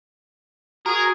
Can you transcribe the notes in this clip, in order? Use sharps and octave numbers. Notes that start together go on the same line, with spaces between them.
F#4 G#4 A#4